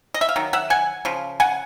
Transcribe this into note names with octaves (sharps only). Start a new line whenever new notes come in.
D#5
E5
F5
D#3 F#3
E5 F#5
F#5 G#5
C#3 F3
F#5 G#5